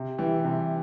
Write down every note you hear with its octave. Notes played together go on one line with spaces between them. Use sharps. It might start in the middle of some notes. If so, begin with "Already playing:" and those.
Already playing: C3
E3 G3
C3